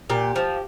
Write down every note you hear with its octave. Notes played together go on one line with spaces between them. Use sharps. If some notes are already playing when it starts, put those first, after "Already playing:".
A#2 G4
F3